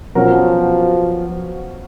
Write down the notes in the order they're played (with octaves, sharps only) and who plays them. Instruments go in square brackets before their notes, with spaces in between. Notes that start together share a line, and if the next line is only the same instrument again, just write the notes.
[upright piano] B2 F#3 C#4 F#4 A#4 [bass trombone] F3